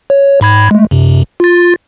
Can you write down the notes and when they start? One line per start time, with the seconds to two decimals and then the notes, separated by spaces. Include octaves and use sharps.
0.10 C#5
0.41 G#2 B5 G#6
0.71 G#3 A3
0.91 F#2 C3
1.40 F4 A6